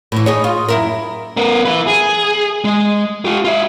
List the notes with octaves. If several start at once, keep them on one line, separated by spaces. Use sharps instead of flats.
A2 E3
D#4 G#4 C#5
F4
F#2 E4 A#4
B3 A#4
E4 B4
G#4
G#3
F4 G4
F4 E5